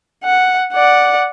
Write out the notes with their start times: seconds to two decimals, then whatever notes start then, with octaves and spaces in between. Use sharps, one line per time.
0.24 F#5
0.73 D5 F#5